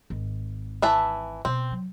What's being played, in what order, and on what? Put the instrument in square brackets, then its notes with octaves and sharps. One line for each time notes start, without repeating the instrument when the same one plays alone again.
[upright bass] G#1
[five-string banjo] E3 E5 A5
[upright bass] B2 [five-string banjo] C4
[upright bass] F#3